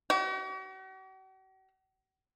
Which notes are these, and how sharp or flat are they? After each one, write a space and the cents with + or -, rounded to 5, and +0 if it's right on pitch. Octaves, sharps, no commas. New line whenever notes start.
F#4 +45